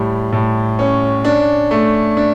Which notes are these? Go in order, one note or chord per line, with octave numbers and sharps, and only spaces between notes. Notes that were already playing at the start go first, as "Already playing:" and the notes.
Already playing: A2 G3
A2
C#4
D4
A3
D4